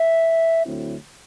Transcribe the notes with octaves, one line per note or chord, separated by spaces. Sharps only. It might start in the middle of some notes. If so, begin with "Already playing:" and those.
Already playing: E5
D2 D3 F#3 C4 E4